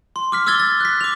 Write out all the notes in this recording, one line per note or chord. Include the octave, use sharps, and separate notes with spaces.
C6
D6 F6 B6
D6 E6 F6 G#6 A6 G7
A6
F#6 B6
D6 F7